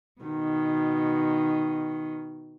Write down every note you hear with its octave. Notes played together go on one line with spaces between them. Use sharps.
B2 D#3